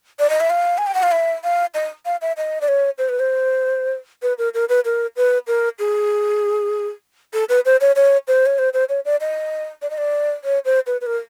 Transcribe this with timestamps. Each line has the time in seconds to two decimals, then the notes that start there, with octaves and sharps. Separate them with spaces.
0.19 D5
0.30 D#5
0.40 E5
0.50 F5
0.78 G#5
0.87 G5
0.94 F#5
1.03 F5
1.12 E5
1.44 F5
1.74 D#5
2.05 F5
2.21 E5
2.37 D#5
2.61 D5
2.68 C#5
2.98 C5
3.09 B4
3.19 C5
4.22 B4
4.38 A#4
4.54 A#4
4.69 B4
4.85 A#4
5.16 B4
5.47 A#4
5.79 G#4
7.34 A4
7.49 B4
7.65 C5
7.81 C#5
7.96 C#5
8.28 C5
8.46 C#5
8.58 C5
8.73 C5
8.89 C#5
9.05 D5
9.21 D#5
9.82 D5
9.90 D#5
9.98 D5
10.44 C#5
10.65 C5
10.87 B4
11.01 B4
11.06 A#4